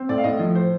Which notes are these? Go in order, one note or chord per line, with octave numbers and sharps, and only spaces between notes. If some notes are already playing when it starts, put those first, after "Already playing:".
Already playing: C4
A2 D5
F5
A2 D#5
F3
C5